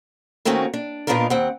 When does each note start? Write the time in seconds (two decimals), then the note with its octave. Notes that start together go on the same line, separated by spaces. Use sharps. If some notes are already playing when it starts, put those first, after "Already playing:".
0.45 D#3 A3 A#3 C4 C#4 F#4
0.74 D4
1.07 A#2 B3 D4 D#4 F4 A#4
1.30 D#2 C4 F#5